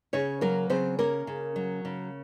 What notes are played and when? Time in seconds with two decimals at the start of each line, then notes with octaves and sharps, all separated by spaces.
0.13 C#3 C#4 C#5
0.41 F#3 A#3 A#4
0.70 C#3 C4 C5
0.99 A#3 C#4 A#4
1.27 C#3
1.56 F#3
1.85 C#3